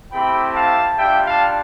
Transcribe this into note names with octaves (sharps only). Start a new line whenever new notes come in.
A3 C4 E4 G4 G5 B5
F5 A5
G3 D4 F4 E5 G5
F5 A5